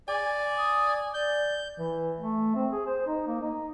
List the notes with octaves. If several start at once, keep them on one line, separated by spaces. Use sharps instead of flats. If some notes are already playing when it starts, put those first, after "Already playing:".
D5 G#5
D#6
D5 G6
E3
A3
C4
G#4
C5
D#4
A#3
D#4